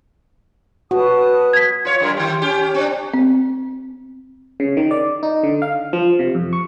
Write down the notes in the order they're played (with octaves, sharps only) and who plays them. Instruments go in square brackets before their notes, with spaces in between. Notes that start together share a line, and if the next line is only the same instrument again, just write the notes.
[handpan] F#4 [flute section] B4 A5 D#6
[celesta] G#6 B6
[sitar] F4 C#5
F#2 G3 A#4
D#3 G4
C#4 G4
C#4
C4 D4
[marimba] C4
[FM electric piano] C#3
D#3
D5
D#4
D3
F5
F3
C3
F2
C#6